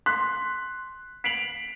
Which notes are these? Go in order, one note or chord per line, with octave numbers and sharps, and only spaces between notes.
C6 F#6 B6
B6 C7 D7 F7 F#7